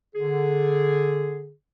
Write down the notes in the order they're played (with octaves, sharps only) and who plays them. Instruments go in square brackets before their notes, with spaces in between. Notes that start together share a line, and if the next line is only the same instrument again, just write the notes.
[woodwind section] D3 G#4